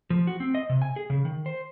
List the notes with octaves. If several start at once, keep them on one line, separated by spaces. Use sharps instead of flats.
F3
F#4
C4
D#5
C3
G#5
G#4
C#3
D#3
C5